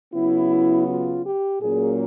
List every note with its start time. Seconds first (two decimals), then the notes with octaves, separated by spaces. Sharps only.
0.14 C#3 F#3 B3 E4
0.88 F4
1.24 G4
1.61 A#2 F#3 A#3 C#4 G#4